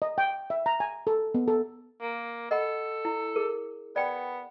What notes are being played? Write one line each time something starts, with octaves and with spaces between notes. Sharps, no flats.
D#5
G5
E5
A#5
G#5
A4
B3
A4
A#3
A4 D#5 F#5 B5
E4
G#4 A#4
B3 D5 G5 B5